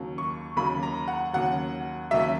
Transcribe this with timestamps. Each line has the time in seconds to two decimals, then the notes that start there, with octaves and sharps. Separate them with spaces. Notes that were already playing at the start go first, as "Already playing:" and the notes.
Already playing: D#2 C#3 F#3
0.18 C#6
0.56 D#2 C#3 F#3 B5
0.83 A#5
1.08 F#5
1.33 D#2 C#3 F#3 F#5
2.11 D#2 C#3 F#3 E5